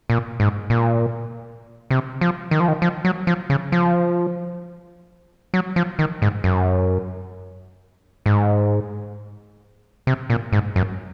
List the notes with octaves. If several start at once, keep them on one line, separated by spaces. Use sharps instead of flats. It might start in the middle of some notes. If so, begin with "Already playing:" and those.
A#2
G#2
A#2
C3
F3
D#3
F3
D#3
F3
F#3
F3
C#3
F3
F#3
F3
D#3
G#2
F#2
G#2
C3
A#2
G#2
F#2